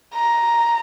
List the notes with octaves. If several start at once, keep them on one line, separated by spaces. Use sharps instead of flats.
A#5